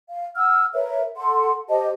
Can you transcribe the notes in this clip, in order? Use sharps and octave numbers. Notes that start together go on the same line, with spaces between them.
F5
F#5 E6 F6
A#4 B4 C#5 E5
A4 F#5 C6
G4 C5 D#5 A5